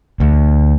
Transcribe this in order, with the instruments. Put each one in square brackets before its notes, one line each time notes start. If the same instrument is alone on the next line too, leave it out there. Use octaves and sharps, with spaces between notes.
[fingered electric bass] D2